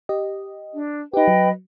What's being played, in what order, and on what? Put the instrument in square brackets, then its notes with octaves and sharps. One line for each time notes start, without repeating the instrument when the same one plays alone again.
[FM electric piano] G4 D#5
[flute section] D4
[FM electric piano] D#4 G4 [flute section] B4 D#5 G5
[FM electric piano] F#3